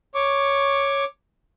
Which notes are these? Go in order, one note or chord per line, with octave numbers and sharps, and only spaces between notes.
C#5 C#6 D6